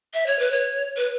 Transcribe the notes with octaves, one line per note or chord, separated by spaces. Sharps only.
E5
C#5
B4
C#5
B4